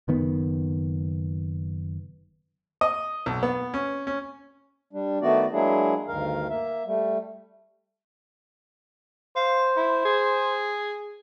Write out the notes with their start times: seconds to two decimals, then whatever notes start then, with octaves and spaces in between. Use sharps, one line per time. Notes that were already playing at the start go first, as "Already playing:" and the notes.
0.08 F#1 D#3 B3
2.81 D#5
3.26 B1
3.43 B3
3.74 C#4
4.07 C#4
4.93 G3 D4
5.22 D#3 A3 B3 F#4 D5
5.52 F#3 G#3 A#3 D4 E4 G#4
6.08 D2 G2 D#3 A#4 F5
6.50 A#3 E5
6.85 G3 A3
9.36 C5 F5
9.76 E4
10.05 G#4